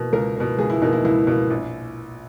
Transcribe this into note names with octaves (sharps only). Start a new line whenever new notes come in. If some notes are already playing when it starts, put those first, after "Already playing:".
Already playing: B2 A#3
C#2 A#4
B2 A#3
C#2 G#4
E4
B2 A#3 D#4
E4
C#2 E4
B2 A#3
A#1